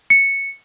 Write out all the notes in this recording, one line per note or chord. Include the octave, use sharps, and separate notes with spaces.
C#7